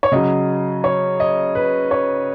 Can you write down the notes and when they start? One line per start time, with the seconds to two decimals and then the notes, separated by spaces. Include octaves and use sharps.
0.03 C#5
0.12 C#3 F#3 D#5
0.84 C#5
1.20 D#5
1.55 B4
1.91 C#5